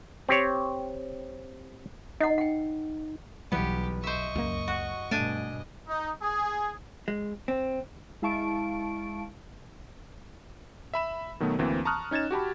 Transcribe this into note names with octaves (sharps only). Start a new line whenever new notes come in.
C4 G4 C#5
D#4 D#5 F#5
F#5 G5
B1 E3 G3 B3 G4
C5 D#5 E5 C#6
C#2 F#2 A#3
F#4
G2 B2 A3 D4 D#5 G#5
D#4
G#4
G#3
C4
G#3 E4 F5 A5 C#6 D7
E5 B5 E7
B2 D#3 F#3 A3 B3
D2 E3 A#3 C4
A5 A#5 C#6 D#6 F6 F#6
C#4 D#4 G#6 A6 E7
F#4 G4 A5 B5